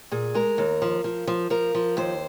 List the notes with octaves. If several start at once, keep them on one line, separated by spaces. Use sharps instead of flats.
A#2 G#4
G#3 A#4
D#2
F3
F3
F3
F3 A#4
F3
D#2 C5